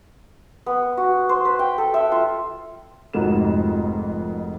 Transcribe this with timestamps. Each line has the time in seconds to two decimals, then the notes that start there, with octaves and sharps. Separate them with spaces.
0.66 B3
0.97 F#4
1.29 C5
1.45 B4
1.59 G5
1.78 A4
1.94 E5
2.12 F4
3.13 F1 F2 G#2 F#4 A#4 E7